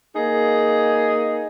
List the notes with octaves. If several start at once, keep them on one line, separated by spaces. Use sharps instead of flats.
A#3 D#4 G#4